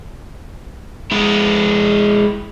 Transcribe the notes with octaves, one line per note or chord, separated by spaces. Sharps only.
G#3 E4